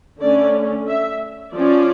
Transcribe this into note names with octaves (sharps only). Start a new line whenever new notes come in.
D3 A3 C#4 D5
E5
F3 C#4 D5